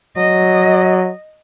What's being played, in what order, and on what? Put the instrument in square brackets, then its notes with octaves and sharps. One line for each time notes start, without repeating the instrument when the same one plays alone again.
[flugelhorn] F#3 [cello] D#5